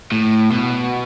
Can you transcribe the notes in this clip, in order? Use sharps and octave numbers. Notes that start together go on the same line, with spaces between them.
A2
B2